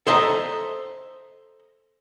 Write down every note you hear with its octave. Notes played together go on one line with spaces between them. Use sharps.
A4 C5 D#5 E5 A#5